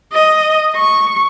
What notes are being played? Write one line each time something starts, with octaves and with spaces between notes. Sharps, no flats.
D#5
C#6